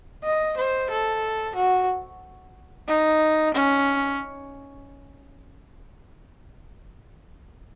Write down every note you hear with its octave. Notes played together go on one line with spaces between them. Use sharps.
D#5
C5
A4
F#4
D#4
C#4